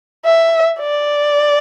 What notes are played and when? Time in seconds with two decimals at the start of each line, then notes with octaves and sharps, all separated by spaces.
0.25 E5
0.80 D5